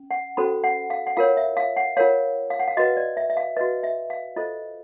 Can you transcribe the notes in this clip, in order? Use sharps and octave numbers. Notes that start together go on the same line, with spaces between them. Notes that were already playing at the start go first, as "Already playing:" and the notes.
Already playing: C#4
F#5
C#4 F#4 A4 C5 B5
F#5
F5
F#5
F4 A#4 C#5 F5
E5
F5
F#5
F4 A#4 C#5 F5
F5
F#5
F5
F#4 B4 D#5
D5
E5
E5
F5
F#4 B4 D#5
E5
F5
F4 A4 C5 D#5